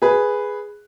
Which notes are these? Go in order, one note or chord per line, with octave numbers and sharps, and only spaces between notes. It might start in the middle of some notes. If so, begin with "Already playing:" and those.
G#4 B4